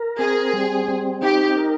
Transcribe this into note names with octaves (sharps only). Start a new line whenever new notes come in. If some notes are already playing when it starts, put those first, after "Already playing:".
Already playing: A#4
C4 G#4
G3
C4
D#4 G4
A#4